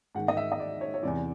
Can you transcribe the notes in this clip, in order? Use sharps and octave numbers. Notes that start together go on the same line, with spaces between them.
G#2 D#3 F#5
D#5
E5
D#5
D5
C#5
C#5
E2 C3 E3 D5